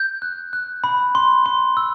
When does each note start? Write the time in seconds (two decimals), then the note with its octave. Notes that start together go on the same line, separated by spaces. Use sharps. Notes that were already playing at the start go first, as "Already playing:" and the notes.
Already playing: G6
0.22 F#6
0.53 F#6
0.84 B5
1.15 C6
1.46 C6
1.77 E6